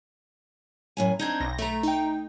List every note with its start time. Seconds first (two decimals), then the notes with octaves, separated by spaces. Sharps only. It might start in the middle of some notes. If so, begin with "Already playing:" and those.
0.97 F#2 A2 G#5
1.19 C4 D4 D#4 G6 G#6
1.40 B1 A#6
1.59 A3 E5 A#5
1.83 D#4 G5